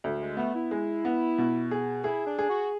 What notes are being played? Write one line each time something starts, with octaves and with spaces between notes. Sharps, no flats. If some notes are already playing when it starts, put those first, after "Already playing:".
D2
G#3
A3 B3
E4
G#3
B3
B2
G#4
E4 G#4
D4
G#4
F#4